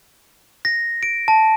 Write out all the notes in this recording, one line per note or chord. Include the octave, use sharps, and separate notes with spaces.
A#6
D7
A5